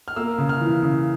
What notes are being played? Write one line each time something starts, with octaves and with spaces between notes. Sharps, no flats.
F6
A#3 E6
C#3
F6
E3
C#3